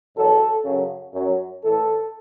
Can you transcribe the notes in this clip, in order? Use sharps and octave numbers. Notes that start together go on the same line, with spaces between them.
E2 B2 F#3 A4
F#2 C#3 F#3
F#2 F#3
A2 E3 A4